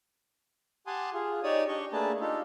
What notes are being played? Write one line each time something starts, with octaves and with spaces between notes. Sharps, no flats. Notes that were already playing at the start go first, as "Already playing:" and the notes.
G4 F#5 G#5 A5 C6 D#6
F4 G#4
D#4 G4 C#5 D5 D#6
D4 G4 D#5 C#6
A3 A#3 D4 G#4 B4 A5
D4 D#4 F4 G4 A4